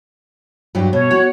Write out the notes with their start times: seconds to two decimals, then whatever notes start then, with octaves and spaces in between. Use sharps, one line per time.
0.75 G2 F#3 G4
0.93 B2 C#5
1.11 F#4 F#5